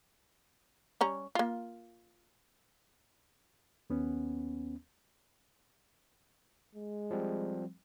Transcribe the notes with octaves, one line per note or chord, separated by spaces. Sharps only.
G3 C#4 A#5
A#3 F4
D#2 B3 C#4
G#3
F3 G3 C4